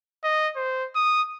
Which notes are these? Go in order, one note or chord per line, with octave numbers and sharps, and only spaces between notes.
D#5
C5
D#6